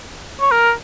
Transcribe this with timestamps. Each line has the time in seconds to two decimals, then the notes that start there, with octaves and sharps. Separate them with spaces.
0.41 C#5
0.52 A#4